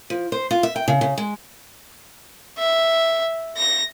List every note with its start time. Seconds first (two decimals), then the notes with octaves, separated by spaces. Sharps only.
0.10 F3
0.32 C5
0.51 F4
0.63 E5
0.76 G5
0.88 C#3
1.01 C#3
1.18 G#3
2.58 E5
3.57 A#6